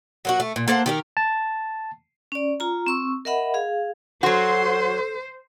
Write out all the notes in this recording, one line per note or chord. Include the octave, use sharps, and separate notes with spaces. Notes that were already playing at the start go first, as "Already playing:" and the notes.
F#3 A#3 F#4
A3
A#2
A#3 A4 C5 F#5
D#3 G4 A#4
A5
C#4 D5
F4 A#5
C4 C#6 E6
A#4 D#5 E5 F#5 B5
G#4 F5
F#3 F#4 A4 C5 C6